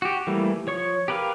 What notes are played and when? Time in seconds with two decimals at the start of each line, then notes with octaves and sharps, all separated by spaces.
0.02 F#4 G4
0.27 E3 G3 A3 A#3
0.67 F3 C#5 C#6
1.08 G4 A#4 B4 D#5 F5